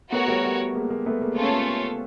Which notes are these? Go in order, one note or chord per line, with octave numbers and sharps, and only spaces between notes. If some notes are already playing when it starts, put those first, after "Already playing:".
A3 B3 F#4 A#4 C#5
G3 A3
G3
G#3 A#3
G#3 A#3
A3 B3
G#3 A#3
A3 C#4 F4 A4 C#5